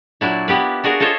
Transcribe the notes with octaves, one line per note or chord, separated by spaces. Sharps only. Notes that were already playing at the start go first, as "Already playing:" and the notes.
A#2 F#3 D4 E4
A#3 B3 G4 B4
D4 F#4 G#4 A#4
F4 A4 C5 C#5 D#5